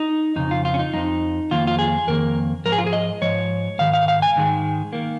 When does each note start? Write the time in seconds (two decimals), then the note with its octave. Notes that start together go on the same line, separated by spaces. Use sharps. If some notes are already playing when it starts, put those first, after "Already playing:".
Already playing: D#4
0.36 F2 C#3 D#4
0.51 F4
0.65 F4
0.74 C#4
0.79 D#4
0.93 F2 C#3 F3 D#4
1.51 F2 D#3 A#3 F4
1.67 F4
1.79 G#4
2.07 F2 D#3 A#3 A#4
2.65 G#2 F3 A#4
2.72 G#4
2.78 F4
2.86 G#4
2.93 D#5
3.21 G#2 F3 C#5
3.79 G#2 D#3 F5
3.94 F5
4.08 F5
4.22 G#5
4.36 G#2 D#3 G#3
4.93 D#3 A#3